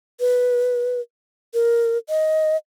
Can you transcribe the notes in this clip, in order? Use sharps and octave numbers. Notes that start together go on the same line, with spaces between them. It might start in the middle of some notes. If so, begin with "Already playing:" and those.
B4
A#4
D#5